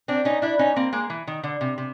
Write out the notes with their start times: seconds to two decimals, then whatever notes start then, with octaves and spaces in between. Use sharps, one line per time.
0.08 C4 D4
0.25 C#4 D#4
0.42 D4 E4
0.59 C#4 D#4
0.76 A#3 C4
0.93 G#3 A#3
1.10 E3
1.27 D#3
1.43 D3
1.61 C3
1.78 C3